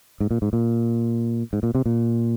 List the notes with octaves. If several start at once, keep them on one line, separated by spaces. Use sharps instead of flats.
G#2
A#2
G#2
A#2
G#2
A#2
C3
A#2